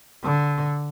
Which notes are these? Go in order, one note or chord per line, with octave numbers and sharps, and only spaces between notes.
D3